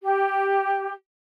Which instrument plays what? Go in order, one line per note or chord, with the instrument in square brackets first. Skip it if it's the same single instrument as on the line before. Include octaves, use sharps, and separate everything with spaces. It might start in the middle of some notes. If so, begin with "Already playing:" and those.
[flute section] G4